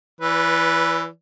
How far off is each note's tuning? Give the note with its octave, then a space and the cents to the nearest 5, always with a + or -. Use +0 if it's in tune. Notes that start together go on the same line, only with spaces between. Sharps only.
E3 +10 B4 -10 D5 -40